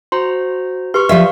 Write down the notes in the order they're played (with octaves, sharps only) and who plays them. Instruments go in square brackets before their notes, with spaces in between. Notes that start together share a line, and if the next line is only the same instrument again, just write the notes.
[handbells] F#4 C5 A#5 [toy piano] C6
[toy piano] G4 B4 [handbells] C6 C#6 F6
[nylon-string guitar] F3 E5 [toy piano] G4 D5 [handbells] F5